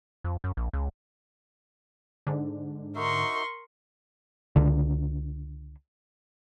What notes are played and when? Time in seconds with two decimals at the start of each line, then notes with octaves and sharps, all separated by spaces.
0.24 F2
0.44 F#2
0.57 A#1
0.73 C#2
2.27 G#2 D3
2.95 D#4 F#4 A#4 E5 C6 C#6
4.56 C#2 D3